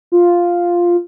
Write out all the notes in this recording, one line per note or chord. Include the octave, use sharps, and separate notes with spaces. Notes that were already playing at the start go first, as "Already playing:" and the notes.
F4